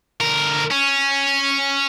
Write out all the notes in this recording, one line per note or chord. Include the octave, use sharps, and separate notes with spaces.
D2 A#4
C#4